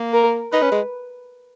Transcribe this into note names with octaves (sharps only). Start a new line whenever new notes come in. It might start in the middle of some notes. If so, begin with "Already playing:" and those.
Already playing: A#3
A#4
D#4 B4
C#4
G#3